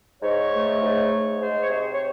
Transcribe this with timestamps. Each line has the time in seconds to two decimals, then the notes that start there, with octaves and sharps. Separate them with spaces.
0.22 G#2 C#5
0.52 A3
0.82 G#2
1.10 G#2
1.40 G#3 C5
1.61 C#5
1.69 C3 C5
1.93 C#5